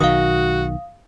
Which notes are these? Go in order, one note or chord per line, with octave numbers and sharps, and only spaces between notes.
B1 D#3 F#4 F5 D#6